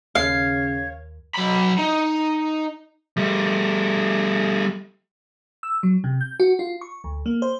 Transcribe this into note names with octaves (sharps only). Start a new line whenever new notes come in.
D#2 C#3 C#5 F5
F#3 B5
D#4
G3 A3
E6
F#3
C3
G6
F#4
F4
C#6
D2
A#3
C5